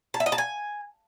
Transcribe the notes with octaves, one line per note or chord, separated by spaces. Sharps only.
A5
E5
D#5
A5
G#5